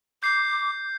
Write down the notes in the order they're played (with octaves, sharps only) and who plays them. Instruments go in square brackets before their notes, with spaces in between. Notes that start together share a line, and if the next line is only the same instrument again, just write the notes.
[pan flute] D6 [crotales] G6 C7